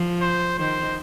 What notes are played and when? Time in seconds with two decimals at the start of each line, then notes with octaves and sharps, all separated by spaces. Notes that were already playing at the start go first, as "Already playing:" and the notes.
Already playing: F3
0.21 C5
0.59 D#3 C5